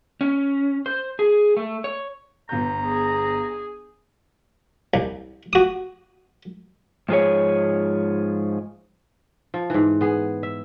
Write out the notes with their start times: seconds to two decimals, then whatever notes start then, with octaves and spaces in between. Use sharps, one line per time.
0.21 C#4
0.86 C5
1.19 G#4
1.57 A3
1.84 C#5
2.49 G1 B3 A#5 G6
2.86 G#4
4.94 C2
5.53 F#4 D#6
7.09 G#2 F3 G#4 C#5
9.54 F3
9.70 G#2 E3
10.01 B3 G#4
10.43 E5